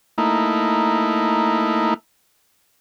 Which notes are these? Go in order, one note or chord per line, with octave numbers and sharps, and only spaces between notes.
A3 A#3 D#4 E4